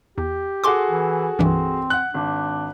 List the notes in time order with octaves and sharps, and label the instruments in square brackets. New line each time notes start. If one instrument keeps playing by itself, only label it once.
[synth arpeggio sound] E2 [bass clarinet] G4
[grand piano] F#4 G#4 A4 [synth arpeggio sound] C6 D6
[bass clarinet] E3
[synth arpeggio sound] C2 G2 E3 [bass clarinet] C4
[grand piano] F#5 F#6
[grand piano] G#1 [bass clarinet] D4